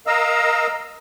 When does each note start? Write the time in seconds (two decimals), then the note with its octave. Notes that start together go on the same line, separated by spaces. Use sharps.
0.07 A#4 D#5 F5 A#5 E6